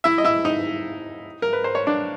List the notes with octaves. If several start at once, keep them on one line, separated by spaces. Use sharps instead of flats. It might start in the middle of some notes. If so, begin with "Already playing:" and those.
E4 E5
D#5
E4 E5
D#4 D#5
A#4
B4
C5
C#5
D4 D5